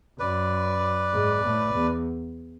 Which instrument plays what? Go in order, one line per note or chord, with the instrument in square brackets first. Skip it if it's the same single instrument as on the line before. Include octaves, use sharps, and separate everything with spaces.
[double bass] F#2 [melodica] B4 D5
[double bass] G#2
A2
E2